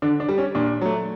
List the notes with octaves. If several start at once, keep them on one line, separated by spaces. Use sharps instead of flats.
D3 D4
D4
G3
C#4
A#2 D4
F#3 A3